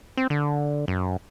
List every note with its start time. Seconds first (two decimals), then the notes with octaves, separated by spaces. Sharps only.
0.17 C4
0.30 D3
0.88 F#2